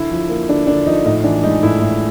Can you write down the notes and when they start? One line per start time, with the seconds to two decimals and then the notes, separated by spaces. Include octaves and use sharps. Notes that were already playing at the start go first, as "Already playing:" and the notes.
Already playing: D3 E4
0.11 F3
0.29 A#3
0.49 D3 D4
0.67 D3 D4
0.86 F3 D#4
1.05 A2 D#4
1.24 E3 D4
1.43 G#3 D#4
1.63 A2 E4
1.82 A2